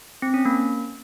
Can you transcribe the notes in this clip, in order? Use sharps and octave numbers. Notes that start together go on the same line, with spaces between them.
C4
C#4
A#3